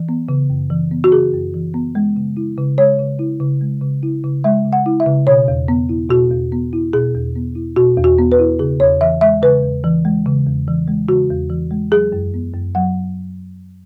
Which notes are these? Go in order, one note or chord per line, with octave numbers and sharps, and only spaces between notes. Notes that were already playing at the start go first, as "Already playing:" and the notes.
Already playing: E3
B3
C#3
F#2
E3
B3
F#4
C#3 G#4
F#2
E3
B3
G#3
C#3
E4
C#3
G#3 C#5
C#3
E4
C#3
G#3
C#3
E4
C#3
G#3 E5
C#3
F#5
E4
E5
C#3
B2 C#5
E2
B3
E4
B2 F#4
E2
B3
E4
B2 G#4
E2
B3
E4
B2 F#4
E2
F#4
B3
B4
E4
C#3 G#4
E2 C#5
E3 E5
G#3 E5
C#3 B4
E2
E3
G#3
C#3
E2
E3
G#3
C#3 F#4
E2
E3
G#3
F#3 G#4
F#2
B3
F#2
F#3 F#5